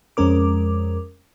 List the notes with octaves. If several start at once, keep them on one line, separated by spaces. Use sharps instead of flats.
F2 G#3 C#4 A#4 D6